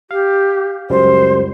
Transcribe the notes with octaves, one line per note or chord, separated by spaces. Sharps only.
G4 F5
C#2 F#2 G3 C5